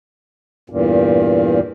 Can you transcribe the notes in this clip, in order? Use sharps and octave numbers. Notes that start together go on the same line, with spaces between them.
E2 G2 A#2